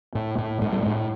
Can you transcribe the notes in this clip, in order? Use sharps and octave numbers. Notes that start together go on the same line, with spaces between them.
A2
A2
A2 G#3
G3
G#3
A2